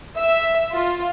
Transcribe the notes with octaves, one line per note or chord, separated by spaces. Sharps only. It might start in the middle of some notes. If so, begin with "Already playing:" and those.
E5
F4